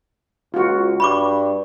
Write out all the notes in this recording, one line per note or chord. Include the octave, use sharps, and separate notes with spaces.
C#2 F4 F#4
G2 B5 C#6 D6